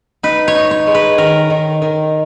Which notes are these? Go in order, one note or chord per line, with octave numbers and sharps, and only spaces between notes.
D#4 B4
C#5
D#4
C#5
G#3
B4
D#3 A#4
D#3
D#3